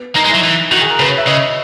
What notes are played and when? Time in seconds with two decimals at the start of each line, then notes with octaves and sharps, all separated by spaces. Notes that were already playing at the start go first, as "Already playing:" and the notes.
Already playing: B3
0.15 A#3 D#4
0.24 G#3
0.29 F#3 E4
0.43 E3
0.72 D#3 F#4
0.81 G#4
0.90 A#4
1.00 C#3 B4
1.09 C#5
1.18 E5
1.27 C#3 D#5